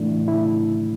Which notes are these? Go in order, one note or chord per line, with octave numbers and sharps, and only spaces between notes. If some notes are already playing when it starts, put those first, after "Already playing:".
Already playing: A2 E3 A3 D4 E4
E4